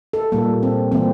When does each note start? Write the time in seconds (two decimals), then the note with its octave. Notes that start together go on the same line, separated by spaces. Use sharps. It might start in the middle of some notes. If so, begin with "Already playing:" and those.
0.13 A4
0.32 A#2 G3 A#3
0.63 C4
0.92 E3 G3 A#3 C4